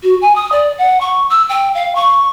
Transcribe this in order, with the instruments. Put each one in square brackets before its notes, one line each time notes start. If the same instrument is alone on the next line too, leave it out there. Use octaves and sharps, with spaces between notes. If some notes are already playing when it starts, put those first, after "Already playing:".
[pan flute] F#4
G#5
D#6
D5
F#5
C#6
E6
G5
F5
C#6